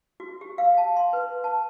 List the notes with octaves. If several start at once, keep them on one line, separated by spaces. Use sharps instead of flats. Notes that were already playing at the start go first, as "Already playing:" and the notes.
F#4
G4
F5
A5
C6
B4
A5